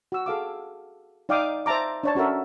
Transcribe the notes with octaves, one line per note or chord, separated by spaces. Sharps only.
F#4 E6
G#4 A4 F5 D6
D#4 D5 F5 G5 D6 D#6
C5 E5 A5 A#5 D6
D4 C#5 A5
C#4 F#4 A4 A#4 E5